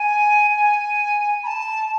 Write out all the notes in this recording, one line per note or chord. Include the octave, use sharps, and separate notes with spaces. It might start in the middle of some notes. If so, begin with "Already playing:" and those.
Already playing: G#5
G#5
B5
A5